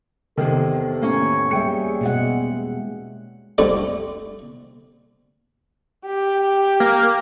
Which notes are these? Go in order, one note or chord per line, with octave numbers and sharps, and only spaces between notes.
E2 C3 D#3 A#3 A4
A2 A#3 C#4 C#5
G3 G#3 G#4 E5 G5 C#7
B2 G#3 F#5
F2 D3 G3 A3 D6
G4
A#3